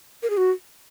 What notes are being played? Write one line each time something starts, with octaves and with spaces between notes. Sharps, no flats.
A#4
G#4
F#4